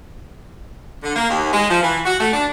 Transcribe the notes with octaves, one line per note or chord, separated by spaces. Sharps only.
D3
A#3
D#2
G#3
F3
E3
F#4
A3
D4